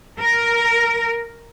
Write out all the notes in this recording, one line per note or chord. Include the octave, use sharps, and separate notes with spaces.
A#4